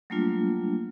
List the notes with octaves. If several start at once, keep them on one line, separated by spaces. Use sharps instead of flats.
F#3 G3 A3 A#3 D4 F4